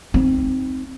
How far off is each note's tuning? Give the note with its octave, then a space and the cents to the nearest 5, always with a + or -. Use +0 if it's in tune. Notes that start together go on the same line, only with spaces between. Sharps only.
C4 +0 D#4 +0